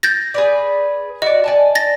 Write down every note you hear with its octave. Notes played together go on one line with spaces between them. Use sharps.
G6 A6 A#6
G#4 B4 D5
F#4 D5 D#5
D5 G#5 A5
A6 A#6